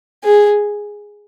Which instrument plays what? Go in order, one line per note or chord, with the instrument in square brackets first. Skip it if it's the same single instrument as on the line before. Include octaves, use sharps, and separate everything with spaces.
[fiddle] G#4